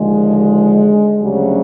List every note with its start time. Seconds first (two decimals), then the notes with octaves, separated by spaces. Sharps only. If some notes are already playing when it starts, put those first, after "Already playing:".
Already playing: D#2 D3 F3 G#3
1.20 D2 C#3 F#3 G3